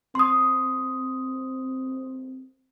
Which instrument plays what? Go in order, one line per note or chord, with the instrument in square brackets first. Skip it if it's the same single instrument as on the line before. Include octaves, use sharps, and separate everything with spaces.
[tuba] C4 [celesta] C6 D#6